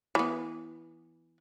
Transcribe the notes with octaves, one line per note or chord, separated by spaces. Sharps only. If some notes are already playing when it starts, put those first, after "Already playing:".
E3 B3